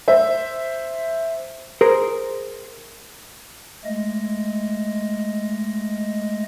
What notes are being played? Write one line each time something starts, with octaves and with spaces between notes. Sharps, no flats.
C5 E5
G#4 A#4 C5
G#3 A3 D#5